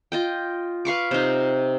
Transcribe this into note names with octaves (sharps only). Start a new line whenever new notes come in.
F4 D#5 G5
B4 F5 C#6 D6
C3 D#4